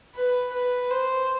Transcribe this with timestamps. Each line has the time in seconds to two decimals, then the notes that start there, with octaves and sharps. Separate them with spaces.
0.15 B4
0.52 B4
0.90 C5